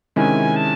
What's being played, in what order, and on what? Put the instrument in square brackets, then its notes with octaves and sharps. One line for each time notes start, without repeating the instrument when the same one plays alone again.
[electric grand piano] C3 D#3 G#3 C#4 E4 [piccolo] G#5
[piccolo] A5